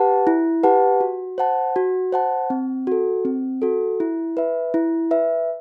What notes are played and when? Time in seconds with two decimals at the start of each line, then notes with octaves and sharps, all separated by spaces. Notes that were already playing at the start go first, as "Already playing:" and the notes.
Already playing: G4 B4 F#5 A5
0.27 E4
0.63 G4 B4 F#5 A5
1.01 F#4
1.38 C5 F#5 A5
1.76 F#4
2.12 C5 F#5 A5
2.50 C4
2.87 F#4 A4
3.25 C4
3.62 F#4 A4
4.00 E4
4.37 B4 E5
4.74 E4
5.11 B4 E5